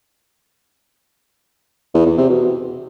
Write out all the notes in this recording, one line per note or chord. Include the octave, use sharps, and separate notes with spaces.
E2
E2
C3
B2